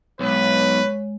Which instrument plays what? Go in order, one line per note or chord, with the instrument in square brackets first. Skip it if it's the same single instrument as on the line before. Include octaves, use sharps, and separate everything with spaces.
[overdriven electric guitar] B1 [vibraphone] G#3 [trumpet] B4 [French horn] C#5